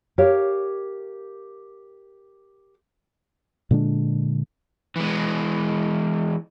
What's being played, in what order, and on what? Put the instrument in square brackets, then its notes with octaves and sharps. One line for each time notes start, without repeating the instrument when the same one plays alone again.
[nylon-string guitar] G4 A#4 C#5 F5
[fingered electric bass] A#2 D3 G#3 D4
[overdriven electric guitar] E3 G#3